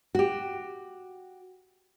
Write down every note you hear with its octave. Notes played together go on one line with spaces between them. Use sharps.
F#4 G4